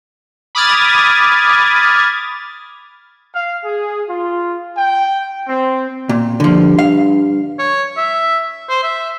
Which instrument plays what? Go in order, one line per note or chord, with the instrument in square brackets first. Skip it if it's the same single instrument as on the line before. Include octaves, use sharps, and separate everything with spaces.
[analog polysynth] B5 D6 D#6 F6 G#6 A6
[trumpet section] F5
G#4
F4
G5
C4
[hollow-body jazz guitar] A#2
[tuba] G2 [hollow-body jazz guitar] D3 F3
[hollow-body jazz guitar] F5
[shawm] C#5
E5
C5
E5